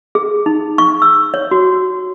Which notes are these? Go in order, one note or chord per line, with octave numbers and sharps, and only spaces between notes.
G#4
D#4
C#6
E6
C#5
F#4